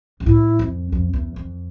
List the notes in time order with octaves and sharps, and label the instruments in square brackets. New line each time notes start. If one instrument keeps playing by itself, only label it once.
[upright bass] G2
[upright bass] A2 [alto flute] E4
[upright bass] F2
F2
E2
F2